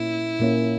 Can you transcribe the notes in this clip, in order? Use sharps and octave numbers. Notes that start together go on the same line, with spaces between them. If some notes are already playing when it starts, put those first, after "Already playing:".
Already playing: A#2 A#3 C#4 E4
A#2 A#3 C#4